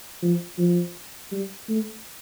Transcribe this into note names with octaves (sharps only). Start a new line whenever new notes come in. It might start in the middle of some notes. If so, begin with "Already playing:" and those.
F3
F3
G3
A3